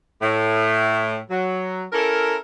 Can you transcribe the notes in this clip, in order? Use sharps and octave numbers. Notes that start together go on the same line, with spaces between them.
A2
F#3
C#4 E4 A4 A#4